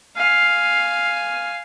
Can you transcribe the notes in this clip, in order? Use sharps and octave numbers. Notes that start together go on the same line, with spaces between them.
F5 G#5